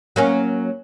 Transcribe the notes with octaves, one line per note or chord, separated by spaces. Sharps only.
F#3 A#3 C#4